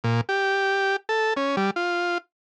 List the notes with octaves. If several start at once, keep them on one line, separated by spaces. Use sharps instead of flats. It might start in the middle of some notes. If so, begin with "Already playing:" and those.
A#2
G4
A4
C#4
G3
F4